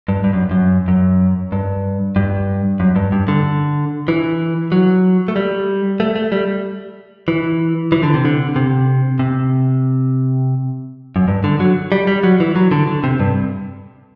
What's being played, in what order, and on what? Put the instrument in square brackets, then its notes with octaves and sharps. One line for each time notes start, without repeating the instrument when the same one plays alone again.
[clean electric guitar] G2
G2
F#2
F#2
F#2
G2
G2
F#2
G2
G2
D3
E3
F#3
A3
G3
A3
A3
G3
E3
E3
D3
C3
D3
C3
C3
F#2
G2
D3
F#3
G3
G3
F#3
E3
F#3
D3
D3
C3
G2